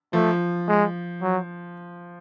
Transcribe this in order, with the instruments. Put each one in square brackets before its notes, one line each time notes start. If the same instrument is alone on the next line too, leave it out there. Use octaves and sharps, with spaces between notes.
[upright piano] F3 [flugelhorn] A3
[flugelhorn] G#3
F#3